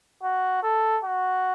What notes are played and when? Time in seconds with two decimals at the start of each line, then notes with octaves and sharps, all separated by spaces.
0.23 F#4
0.63 A4
1.04 F#4